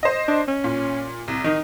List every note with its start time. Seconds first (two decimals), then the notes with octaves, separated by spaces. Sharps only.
0.03 C5 D#5
0.28 D4
0.48 C#4
0.64 A#2
1.28 C2
1.44 D#3 D#4